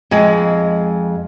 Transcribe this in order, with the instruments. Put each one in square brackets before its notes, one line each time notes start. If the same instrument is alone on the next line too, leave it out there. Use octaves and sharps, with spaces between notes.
[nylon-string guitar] F2 G#3